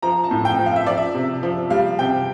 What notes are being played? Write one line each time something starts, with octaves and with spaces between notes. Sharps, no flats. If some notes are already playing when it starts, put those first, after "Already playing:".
F3 A#5
A5
A2
G5
F3
F5
E5
F3 D5
E5
C3
F3
G3 F5
C3 G5